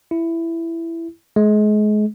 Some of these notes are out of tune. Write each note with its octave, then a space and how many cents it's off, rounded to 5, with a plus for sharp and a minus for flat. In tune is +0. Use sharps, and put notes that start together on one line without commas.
E4 +10
G#3 +30